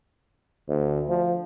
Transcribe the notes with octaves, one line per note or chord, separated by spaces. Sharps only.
D2
F3